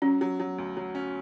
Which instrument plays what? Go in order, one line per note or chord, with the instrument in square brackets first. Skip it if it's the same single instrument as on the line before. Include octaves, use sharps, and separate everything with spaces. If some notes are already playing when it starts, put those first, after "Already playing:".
[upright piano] F#3 [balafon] C#4
[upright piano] F#3
F#3
D2
F#3
C#4